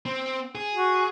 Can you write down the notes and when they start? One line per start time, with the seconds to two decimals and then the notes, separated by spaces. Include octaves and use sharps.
0.06 C4
0.55 G#4
0.74 F#4